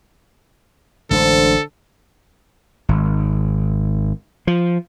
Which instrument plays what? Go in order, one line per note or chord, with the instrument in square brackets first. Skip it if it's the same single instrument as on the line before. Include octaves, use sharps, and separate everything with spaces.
[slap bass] A1 G#3 D4 [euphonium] D3 [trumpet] A4 [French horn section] C5
[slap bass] G#1
F3